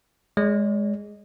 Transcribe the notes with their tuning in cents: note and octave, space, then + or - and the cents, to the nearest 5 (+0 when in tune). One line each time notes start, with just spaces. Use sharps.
G#3 +0 D5 -45